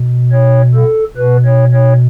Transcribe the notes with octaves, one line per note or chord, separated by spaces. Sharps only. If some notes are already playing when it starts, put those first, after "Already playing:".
Already playing: B2
C#5
A4
B2 B4
C#5
C#5